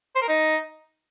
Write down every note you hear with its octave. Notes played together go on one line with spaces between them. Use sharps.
C5
A#4
D#4